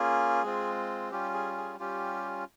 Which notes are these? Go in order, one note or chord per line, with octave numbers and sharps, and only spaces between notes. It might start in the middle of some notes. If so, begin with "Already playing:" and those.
Already playing: A#3 C#4 F4 G#4
G#3 C4 F4
G3 C#4 F4 G4
G#4
G#4
G3 C#4 F4 G4